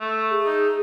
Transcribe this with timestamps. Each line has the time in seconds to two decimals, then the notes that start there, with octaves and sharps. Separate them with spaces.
0.01 A3
0.31 G#4
0.45 D#4